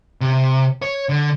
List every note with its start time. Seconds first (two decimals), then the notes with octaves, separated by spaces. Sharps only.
0.21 C3
0.82 C#5
1.09 D3